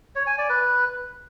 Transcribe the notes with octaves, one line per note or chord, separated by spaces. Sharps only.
C#5
G#5
D5
B4